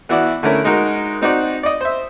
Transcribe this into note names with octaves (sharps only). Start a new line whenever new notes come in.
E3 B3 E4 F#4 D5
D3 A3 C#4 E4 A#4
G#3 D#4 F#4 A#4
C4 D#4 F#4 D5
D5 D#5
C5 E5